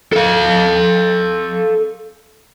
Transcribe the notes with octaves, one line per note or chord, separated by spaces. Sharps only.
A4 F5